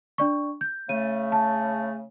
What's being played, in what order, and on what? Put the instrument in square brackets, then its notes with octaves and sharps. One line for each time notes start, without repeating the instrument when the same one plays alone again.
[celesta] D4 D5 C#6
G6
[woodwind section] C#3 A3 [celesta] D#7
[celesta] A5